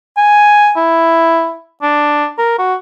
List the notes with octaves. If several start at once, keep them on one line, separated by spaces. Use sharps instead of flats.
G#5
E4
D4
A#4
F#4